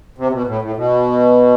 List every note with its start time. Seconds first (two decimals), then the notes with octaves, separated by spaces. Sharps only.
0.18 C3
0.32 B2
0.47 A2
0.62 A2
0.77 B2